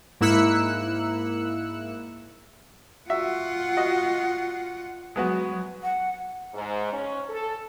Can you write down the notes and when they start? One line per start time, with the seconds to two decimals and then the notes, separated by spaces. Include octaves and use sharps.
0.21 G#2 A#3 E4 E6 F#6 C#7
3.10 F4 F#4 E5 F#5
3.77 F#4 D#5
5.16 F#3 G#3 B3 F#4
5.83 F#5
6.54 G#2
6.92 C#4
7.29 A4